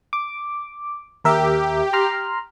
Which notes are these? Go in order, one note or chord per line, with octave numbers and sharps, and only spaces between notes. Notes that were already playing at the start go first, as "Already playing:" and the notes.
D6
D#2 G4 A#4 E5
A#5 C6 F6